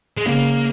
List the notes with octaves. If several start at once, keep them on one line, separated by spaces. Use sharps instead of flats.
G#3
C#3 A#3